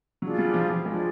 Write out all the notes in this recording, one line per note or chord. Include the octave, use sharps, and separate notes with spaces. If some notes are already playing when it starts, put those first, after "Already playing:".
F#3 D4 F4 G#4
G3
F3
F3
G#3 D4 F4 G#4